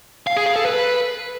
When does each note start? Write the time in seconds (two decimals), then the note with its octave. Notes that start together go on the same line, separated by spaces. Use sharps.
0.27 F5
0.36 G#4
0.46 F5
0.56 A4
0.65 B4